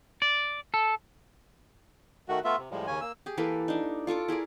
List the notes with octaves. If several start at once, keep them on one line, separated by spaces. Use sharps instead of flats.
D5
A4
D#3 A3 F#4
A3 B3 F4 E5
C3
A2 F3 G3 G#3
D#2 C#3 C#4 G#5
A#3 E6
G4 G#4
E3 A#3 A4 B4
D4 D#4
F4 A4 C#6 D6
E4 G#4 A#4 D5